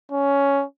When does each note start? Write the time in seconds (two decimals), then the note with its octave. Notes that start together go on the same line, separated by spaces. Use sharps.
0.12 C#4